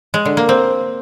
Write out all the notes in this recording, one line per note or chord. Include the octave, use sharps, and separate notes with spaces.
G#3
D3
A#3
C4